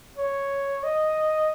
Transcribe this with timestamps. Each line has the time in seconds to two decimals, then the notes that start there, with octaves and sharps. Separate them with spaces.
0.18 C#5
0.83 D#5